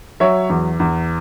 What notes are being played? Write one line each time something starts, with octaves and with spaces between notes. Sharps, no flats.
F#3 C#5 E5
E2
E2